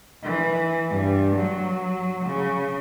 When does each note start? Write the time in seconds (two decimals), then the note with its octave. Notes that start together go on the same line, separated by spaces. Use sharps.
0.23 E3
0.90 G2
1.37 F#3
2.26 C#3